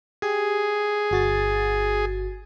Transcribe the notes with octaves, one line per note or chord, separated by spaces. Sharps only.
G4 G#4
G1 F#4 A6